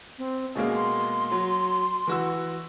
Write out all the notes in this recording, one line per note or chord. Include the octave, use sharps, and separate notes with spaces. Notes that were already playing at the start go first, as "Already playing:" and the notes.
C4
B2 G#3 A#3 C#4
C6
F#3
E3 F#4 E6